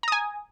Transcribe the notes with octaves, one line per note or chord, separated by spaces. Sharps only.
G#5 A#5 D#6